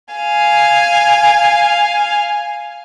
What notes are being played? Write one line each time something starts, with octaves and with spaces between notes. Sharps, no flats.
F5 G#5